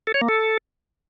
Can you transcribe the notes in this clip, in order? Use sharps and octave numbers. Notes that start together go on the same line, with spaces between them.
A4
C#5
A#3
A4